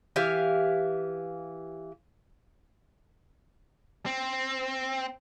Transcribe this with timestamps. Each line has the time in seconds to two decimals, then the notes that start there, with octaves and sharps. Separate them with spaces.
0.16 E3 G4 E5 F5
4.06 C4